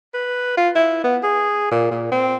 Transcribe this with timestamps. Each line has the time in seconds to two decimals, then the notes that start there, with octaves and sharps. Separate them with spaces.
0.14 B4
0.57 F4
0.75 E4
1.04 B3
1.23 G#4
1.71 A#2
1.91 A#2
2.11 C4